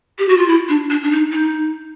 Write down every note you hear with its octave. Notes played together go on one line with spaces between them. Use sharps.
G4
F#4
F4
E4
D4
D4
D4
D#4
D#4